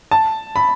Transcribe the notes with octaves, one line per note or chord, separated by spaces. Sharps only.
A5
B5